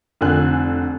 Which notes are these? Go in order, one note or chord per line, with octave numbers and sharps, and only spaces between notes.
F1 D3 G#5 F#6